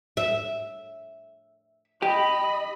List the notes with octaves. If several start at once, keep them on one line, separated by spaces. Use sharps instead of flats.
E5
G4 D#5 G5 B5